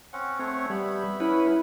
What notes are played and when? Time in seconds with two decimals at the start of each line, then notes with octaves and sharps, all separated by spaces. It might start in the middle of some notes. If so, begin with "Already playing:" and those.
0.13 C4 C#4 F#5
0.39 A3 C4 C#5 F#5
0.70 G3 B3 E5 B5
1.20 C#4 E4 B4